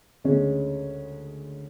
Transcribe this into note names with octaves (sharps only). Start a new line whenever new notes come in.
D2 C#3 G#3 C#4